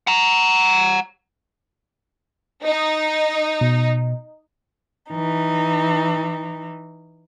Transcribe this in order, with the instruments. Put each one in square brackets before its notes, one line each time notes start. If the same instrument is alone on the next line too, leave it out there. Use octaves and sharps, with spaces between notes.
[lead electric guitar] F#5 A#5
[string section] D#4
[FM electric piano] B2
[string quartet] E3 D#4